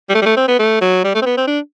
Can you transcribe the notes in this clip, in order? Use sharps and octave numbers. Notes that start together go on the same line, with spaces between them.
G3
A3
G3
A3
C4
B3
A3
F#3
G3
A3
C4
B3
C4
D4